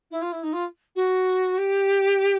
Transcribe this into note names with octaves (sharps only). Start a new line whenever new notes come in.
E4
F4
E4
D#4
F4
F#4
G4